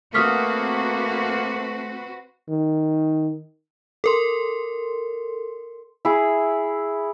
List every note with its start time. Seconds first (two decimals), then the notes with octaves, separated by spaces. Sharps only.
0.14 A3 A#3 C4 F#4 B4 D#6 F6 B6
2.49 D#3
4.04 A4 A#4 C6
6.05 E4 G#4